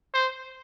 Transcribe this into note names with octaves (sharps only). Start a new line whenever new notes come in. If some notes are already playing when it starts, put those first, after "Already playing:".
C5